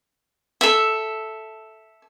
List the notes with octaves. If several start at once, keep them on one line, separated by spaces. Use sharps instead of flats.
A4 E5